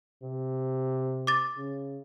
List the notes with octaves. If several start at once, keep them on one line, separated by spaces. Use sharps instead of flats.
C3
D6 A6
C#3